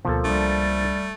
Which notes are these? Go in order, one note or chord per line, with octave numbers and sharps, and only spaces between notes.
D2 B2 F3 A#3 A4
C2 G3 A3 D4